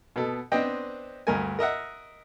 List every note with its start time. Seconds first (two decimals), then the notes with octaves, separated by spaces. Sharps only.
0.16 B2 B3 A4
0.52 B3 C4 D4 C5 D#5 G5
1.27 D2 G2 A#4 G#5
1.59 A#4 D#5 E5 F#5